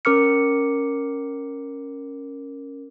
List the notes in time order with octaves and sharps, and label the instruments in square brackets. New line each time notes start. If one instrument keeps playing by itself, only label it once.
[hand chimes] C#4 A#4 D6 F6 C#7